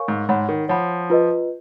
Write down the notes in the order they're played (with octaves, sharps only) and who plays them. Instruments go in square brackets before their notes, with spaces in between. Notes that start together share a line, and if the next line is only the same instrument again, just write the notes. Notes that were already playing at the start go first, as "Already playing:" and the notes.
Already playing: [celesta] A#4 C#5 F5 G#5 C#6
[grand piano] G#2
[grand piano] G#2 [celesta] C#5 F#5 B5
[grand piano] D#3
[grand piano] F3 [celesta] C#5 F#5 B5
[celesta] F4 B4 D#5